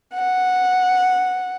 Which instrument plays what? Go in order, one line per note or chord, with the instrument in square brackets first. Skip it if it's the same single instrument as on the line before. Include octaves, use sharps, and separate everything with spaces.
[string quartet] F#5